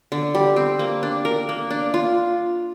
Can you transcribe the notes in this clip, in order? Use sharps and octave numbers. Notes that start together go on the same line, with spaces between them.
D3
G3
C4
A#3
D4
A#4
A#3
D4
F4